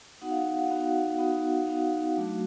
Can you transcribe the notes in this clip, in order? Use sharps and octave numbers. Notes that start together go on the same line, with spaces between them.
B3 D#4 F#4 F#5
F5
F#5
B3 D#4 F#4 F5
B3 D#4 F#4
B3 D#4 F#4 F5
F#3 A3 D4 F#4